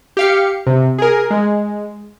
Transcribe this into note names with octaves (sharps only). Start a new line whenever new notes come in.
G4 F5 C#7
C3
G#4 A#4
G#3